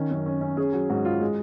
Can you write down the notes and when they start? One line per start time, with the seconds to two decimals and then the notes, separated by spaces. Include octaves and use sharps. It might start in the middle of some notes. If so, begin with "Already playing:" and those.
Already playing: D#3 C#4
0.11 F#2
0.26 C#4
0.41 C#4
0.57 C#4 G#4
0.73 F#3
0.90 G#2 F#4
1.05 F4
1.21 G#3